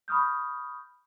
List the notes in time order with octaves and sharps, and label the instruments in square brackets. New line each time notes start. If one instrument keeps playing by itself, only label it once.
[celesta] B5 C#6 D#6 F6 G6